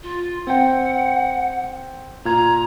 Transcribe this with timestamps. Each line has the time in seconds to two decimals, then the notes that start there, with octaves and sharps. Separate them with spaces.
0.03 F4
0.47 C4 F#5 G5
2.25 A#2 F4 A#5 G#6